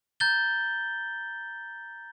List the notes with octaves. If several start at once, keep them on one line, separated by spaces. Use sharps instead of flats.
A#5 G6 A6 G7